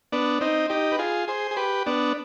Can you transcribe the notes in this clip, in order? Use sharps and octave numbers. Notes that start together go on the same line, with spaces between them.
B3 D4
C4 D#4
D#4 G4
B4
F4 G#4
G#4 C5
G#4
G4 B4
B3 D4